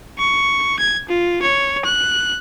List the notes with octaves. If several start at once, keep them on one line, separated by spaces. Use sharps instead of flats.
C#6
G#6
F4
C#5
F#6